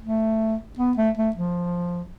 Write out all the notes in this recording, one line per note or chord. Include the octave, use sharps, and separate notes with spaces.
A3
B3
A3
A3
F3